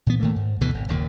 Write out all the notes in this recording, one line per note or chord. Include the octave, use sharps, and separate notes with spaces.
A#2 E3 B3
A2 D#3 A3 A#3
G#2
D2 B2 D3 E3
G#1
F#1 D#2 A#2